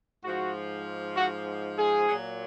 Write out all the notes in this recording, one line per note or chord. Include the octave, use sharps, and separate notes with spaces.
G#2 F3 F#4
F#4
G#4
A#2 F#3